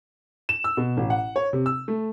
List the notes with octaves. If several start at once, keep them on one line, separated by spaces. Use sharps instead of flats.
E7
E6
B2
A1
F#5
C#5
C3
E6
A3